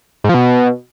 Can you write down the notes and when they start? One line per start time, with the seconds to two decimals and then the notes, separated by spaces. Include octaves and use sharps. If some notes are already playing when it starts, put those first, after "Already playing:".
0.24 G#2
0.29 F3
0.34 B2